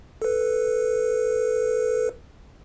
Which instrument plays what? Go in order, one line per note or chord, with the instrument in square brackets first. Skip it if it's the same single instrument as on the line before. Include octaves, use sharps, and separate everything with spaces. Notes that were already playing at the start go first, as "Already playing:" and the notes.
[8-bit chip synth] A4 B4